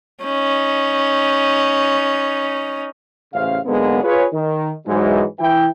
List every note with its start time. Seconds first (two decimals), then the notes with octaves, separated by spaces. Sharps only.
0.24 C#4 D#4
3.34 A1 C#3 C5 E5 F5
3.66 G#2 D3 F#3 G#3 A#3 B3
4.03 F4 G#4 B4 C#5
4.33 D#3
4.87 G#2 E3 F#3 G#3
5.40 E3 E4 G5